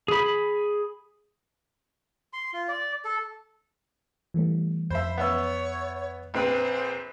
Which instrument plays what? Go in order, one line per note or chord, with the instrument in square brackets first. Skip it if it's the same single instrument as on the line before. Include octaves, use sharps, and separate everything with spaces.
[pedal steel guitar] G#4 B5
[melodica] C6
F4
D5
A4
[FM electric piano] E3 G3 A3
[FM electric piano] F2 [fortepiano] C5 E5 [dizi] B5
[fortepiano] B3 E5 E6 [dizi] C#5
[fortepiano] A#1 C4 B4 [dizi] C5